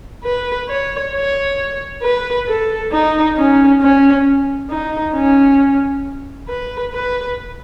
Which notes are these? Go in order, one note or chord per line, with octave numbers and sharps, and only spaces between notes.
B4
C#5
C#5
B4
A4
D#4
C#4
C#4
D#4
C#4
B4
B4